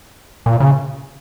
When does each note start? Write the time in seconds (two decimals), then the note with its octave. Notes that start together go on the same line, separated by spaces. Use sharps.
0.46 A#2
0.60 C#3